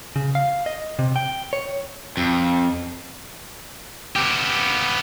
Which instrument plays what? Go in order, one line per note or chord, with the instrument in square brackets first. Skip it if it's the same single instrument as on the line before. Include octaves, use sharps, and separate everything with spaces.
[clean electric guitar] C#3
F5
D#5
C3
G5
C#5
[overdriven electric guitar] F2
[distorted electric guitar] B3 G4